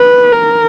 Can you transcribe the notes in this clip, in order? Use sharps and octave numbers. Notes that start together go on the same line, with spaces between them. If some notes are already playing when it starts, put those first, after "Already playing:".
Already playing: B4
A#4